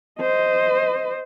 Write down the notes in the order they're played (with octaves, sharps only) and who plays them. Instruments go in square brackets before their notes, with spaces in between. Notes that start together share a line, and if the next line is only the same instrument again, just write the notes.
[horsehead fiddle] C5 D#5